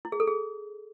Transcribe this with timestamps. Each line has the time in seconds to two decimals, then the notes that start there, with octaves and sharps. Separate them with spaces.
0.05 E4
0.12 G#4
0.20 A4
0.27 G#4